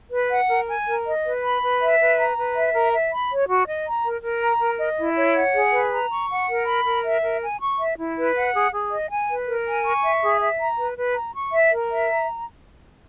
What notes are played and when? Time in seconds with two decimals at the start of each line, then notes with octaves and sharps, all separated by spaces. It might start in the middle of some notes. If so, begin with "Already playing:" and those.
0.12 B4
0.31 F#5
0.49 A#4
0.68 G#5
0.87 A#4
1.06 D#5
1.25 B4
1.43 B5
1.62 B4
1.81 E5
1.99 B4
2.18 A#5
2.37 B4
2.55 E5
2.74 A#4
2.93 E5
3.12 B5
3.31 C#5
3.49 F#4
3.67 D#5
3.86 A#5
4.05 A#4
4.24 A#4
4.42 A#5
4.60 A#4
4.80 D#5
4.99 E4
5.17 C#5
5.36 F#5
5.54 G#4
5.73 B4
5.91 A#5
6.11 C#6
6.30 F#5
6.49 A#4
6.66 B5
6.86 A#4
7.04 E5
7.23 A#4
7.41 G#5
7.60 C#6
7.79 E5
7.97 E4
8.17 B4
8.35 F#5
8.54 G#4
8.72 G#4
8.91 D#5
9.10 G#5
9.29 B4
9.48 A#4
9.66 G#5
9.85 C#6
10.03 E5
10.22 G#4
10.41 E5
10.60 A#5
10.78 B4
10.97 B4
11.16 A#5
11.35 C#6
11.53 E5
11.71 A#4
11.91 E5
12.10 A#5